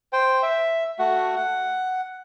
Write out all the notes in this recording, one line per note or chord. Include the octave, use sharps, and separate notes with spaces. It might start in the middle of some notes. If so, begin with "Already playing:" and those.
C5 G5
E5
A3 F#4 F#5
F#5